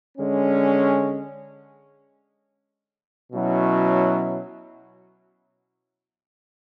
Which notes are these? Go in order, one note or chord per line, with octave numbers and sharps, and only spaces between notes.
D3 G#3 C#4
B2 F#3 C#4 E4